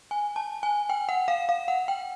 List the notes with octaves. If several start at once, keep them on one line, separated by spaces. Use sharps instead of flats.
G#5
A5
G#5
G5
F#5
F5
F5
F#5
G5